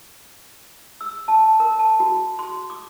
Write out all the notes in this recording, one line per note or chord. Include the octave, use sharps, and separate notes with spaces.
E6
A5
A#4
A5
F#4
C6
D6